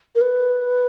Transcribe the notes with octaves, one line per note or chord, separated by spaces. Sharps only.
A#4
B4